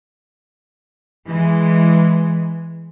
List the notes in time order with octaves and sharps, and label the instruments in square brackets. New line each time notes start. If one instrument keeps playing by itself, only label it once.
[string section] E3 G#3